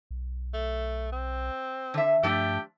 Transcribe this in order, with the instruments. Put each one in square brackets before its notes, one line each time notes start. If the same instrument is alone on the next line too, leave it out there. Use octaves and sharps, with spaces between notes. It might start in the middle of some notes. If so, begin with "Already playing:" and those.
[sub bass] B1
[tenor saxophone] A3
C4
[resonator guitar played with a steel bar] D3 E5
[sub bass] G2 [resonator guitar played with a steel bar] F3 A3 D4 [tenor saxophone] G4